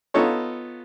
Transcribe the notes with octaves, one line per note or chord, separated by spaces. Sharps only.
B3 D#4 F4 A4 C#5